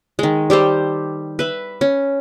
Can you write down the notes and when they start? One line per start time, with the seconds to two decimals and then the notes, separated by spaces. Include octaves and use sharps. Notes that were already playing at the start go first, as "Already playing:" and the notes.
0.19 D#3 G#3
0.50 G3 G4 A4 C5
1.39 B4 E5
1.81 C#4